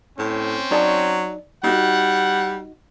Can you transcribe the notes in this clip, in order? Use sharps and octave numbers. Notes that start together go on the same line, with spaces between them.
A2 C4 C#4
F#3 D#4 D5 A5
G3 D#4 F#4 F#5